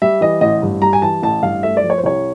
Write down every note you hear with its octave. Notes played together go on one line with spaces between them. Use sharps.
G3 E5
E3 D#5
A1 D#5
G2
G3 A#5
G#5
E3 A5
A1 A5
G2 F5
A3 E5
D5
F3
C#5
C5
C2 C#5